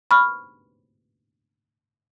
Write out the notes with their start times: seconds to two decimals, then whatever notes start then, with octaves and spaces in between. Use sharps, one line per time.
0.11 B5 C#6 F6